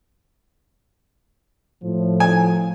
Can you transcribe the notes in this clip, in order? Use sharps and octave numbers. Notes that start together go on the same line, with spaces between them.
A2 F3
G#5